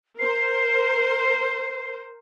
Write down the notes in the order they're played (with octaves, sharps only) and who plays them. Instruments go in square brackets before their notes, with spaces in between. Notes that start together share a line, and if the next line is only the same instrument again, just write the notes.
[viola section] A#4 C5 [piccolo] C7